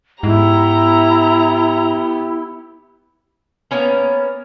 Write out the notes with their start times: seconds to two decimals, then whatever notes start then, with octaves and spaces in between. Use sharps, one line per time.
0.23 G#2 B3 E4 G4 A#5
3.71 A#3 B3 C#4 A#4